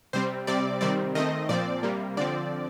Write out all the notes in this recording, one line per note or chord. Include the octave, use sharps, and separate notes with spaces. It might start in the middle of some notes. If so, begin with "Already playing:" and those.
C3 G3 C4 C5
C3 G3 C4 D5
C3 D#3 G3 C4 D5
D#3 A3 C4 D#5
A#2 F3 C4 D5
C3 G3 A#3
D3 F3 C4 D5